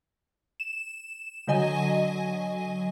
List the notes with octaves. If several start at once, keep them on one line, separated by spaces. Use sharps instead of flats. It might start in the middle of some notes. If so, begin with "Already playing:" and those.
E7
D3 F#3 D#5 G#5